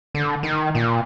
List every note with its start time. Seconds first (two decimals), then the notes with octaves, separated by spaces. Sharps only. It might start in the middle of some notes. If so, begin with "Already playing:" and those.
0.15 D3
0.43 D#3
0.75 A#2